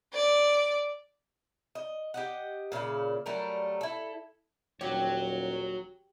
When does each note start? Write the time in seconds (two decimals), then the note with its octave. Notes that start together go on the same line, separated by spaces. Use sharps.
0.14 D5
1.75 D#5
2.14 G4 D#5 F#5
2.72 A#2 C#3 E4 F5
3.26 F#3 G3 A3 A#4
3.81 E4 A4
4.81 D#1 F#4 G4 C#5